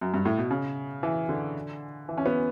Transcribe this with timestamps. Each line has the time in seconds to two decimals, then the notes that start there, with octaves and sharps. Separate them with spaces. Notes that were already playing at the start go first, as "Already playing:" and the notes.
0.01 F#2
0.14 G2
0.25 A2
0.38 B2
0.51 C#3
1.03 E3
1.29 D3
2.09 E3
2.18 C#4
2.26 B3